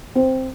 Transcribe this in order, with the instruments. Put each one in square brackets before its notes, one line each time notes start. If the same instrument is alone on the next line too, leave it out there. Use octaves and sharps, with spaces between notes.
[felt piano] C4